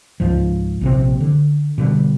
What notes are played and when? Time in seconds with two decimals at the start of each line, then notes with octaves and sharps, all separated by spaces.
0.20 C#2 G#2 F3
0.81 A#1 C3 C4
1.20 D3
1.78 B2 D3 G3